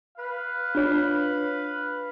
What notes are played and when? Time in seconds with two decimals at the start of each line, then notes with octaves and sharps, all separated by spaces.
0.18 B4 F5
0.75 D4 F4 C#5